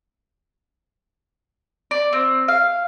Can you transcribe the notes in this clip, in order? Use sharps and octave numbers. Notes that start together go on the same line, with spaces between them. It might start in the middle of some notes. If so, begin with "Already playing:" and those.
D5
C4
F5